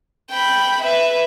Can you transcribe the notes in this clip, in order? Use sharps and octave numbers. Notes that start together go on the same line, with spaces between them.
G5 B5
B4 E5